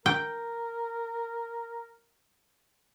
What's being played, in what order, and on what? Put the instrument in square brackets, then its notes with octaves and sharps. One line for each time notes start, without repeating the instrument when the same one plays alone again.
[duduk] A#4 [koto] G5